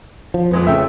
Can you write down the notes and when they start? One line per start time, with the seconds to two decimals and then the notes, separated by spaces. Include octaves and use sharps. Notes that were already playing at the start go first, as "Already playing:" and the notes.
0.34 F3
0.51 F2 A#2 G#3 B3
0.67 C#3 A3 E5 G5